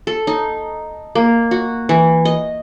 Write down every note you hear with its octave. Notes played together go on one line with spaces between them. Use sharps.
A4
D#4
A#3
F#4
E3
D#5